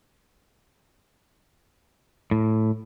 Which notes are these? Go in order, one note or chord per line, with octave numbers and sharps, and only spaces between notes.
A2